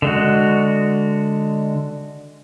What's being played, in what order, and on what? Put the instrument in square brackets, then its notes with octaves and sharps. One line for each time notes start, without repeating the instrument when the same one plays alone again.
[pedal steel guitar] D3 G#3 F#4